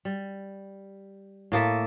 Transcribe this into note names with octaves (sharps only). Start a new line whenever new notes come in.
G3
A2 A#3 A4 E5